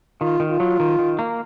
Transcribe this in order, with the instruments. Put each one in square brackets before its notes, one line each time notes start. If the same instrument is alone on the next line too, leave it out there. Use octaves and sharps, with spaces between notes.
[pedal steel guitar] D#3 [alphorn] F4
[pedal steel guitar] D#3
[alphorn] F4
[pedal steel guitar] F#3
D#3
D#3
A#3